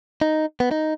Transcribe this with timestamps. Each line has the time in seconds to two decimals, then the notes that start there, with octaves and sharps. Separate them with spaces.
0.21 D#4
0.60 B3
0.71 D#4